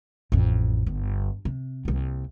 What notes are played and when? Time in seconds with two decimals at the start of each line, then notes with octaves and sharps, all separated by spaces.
0.32 A1 F2
0.87 G1
1.45 C3
1.85 C2 A#3